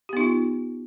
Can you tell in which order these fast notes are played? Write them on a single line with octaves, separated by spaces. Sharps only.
G4 B3 D#4 F4